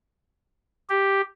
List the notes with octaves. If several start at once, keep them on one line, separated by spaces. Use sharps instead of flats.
G4